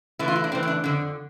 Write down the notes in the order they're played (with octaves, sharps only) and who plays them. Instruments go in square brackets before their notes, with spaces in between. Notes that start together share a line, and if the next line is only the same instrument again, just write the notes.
[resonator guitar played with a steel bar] A2 E3 E4
F4
E4
D4
A2 E3 C4
E4
D4
F2 D3